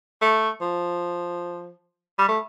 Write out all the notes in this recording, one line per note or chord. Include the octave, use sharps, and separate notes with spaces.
A3
F3
G3
A3